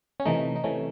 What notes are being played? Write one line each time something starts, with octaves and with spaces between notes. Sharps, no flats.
C#4
C3 E3 A3 D#4
D#4
C3 E3 A3 C#4